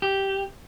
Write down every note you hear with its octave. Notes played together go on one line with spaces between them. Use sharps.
G4